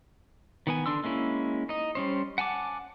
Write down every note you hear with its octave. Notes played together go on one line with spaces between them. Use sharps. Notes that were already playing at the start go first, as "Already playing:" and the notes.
D#3 B3 G#5
D3 D4 C6 E6
G#3 A#3 C#4 E4
D#4 D#5
G3 C#4 C5
F#5 G#5 A5 D6